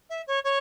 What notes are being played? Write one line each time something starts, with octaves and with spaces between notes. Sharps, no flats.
E5
C#5
C#5